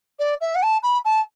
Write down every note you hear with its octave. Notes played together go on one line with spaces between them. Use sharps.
D5
E5
F#5
A5
B5
A5